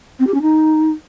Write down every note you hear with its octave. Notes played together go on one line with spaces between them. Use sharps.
C4
G4
C#4
D#4